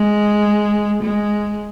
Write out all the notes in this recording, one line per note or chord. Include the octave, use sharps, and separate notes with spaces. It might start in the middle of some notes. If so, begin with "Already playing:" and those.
Already playing: G#3
G#3